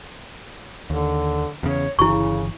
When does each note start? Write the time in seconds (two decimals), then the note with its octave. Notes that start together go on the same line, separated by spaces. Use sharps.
0.90 D#2 D3
1.63 E2 C#3 C#5
1.99 G1 C#3 E3 E4 C#6